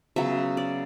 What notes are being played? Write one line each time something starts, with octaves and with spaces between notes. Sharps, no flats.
C#3 F#3 B3 E5
D5